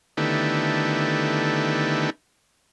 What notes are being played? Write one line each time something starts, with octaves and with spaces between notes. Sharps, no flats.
D3 D#3 A3 B3 E4 G4